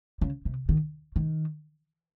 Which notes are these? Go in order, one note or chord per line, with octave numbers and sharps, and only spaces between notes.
C#3
C3
D#3
D#3